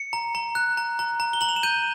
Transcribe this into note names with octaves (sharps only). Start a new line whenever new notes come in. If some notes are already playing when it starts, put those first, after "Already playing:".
Already playing: C#7
A#5
A#5
F#6
A#5
A#5
A#5
G7
A#5 F#7
F7
E7
G6 D#7